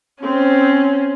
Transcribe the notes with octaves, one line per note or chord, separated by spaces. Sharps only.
C4 C#4